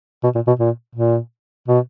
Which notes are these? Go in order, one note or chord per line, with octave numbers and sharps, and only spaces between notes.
B2
A#2
B2
A#2
A#2
B2